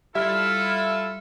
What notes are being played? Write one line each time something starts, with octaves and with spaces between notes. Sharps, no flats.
G3 E4 F4 A4 E5 F6